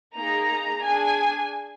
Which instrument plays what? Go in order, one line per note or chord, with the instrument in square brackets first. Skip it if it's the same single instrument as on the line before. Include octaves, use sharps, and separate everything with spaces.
[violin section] A#3 D#4 G#4 A#5
D4 G#4 G#5